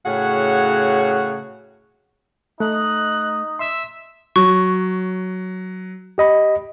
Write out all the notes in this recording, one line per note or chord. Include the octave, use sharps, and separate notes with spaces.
A2 C#3 F#4 G#4 F#5
A3 D#4 D#5 F#6
E5 C6 E6
F#3 C#6
G4 D#5 B5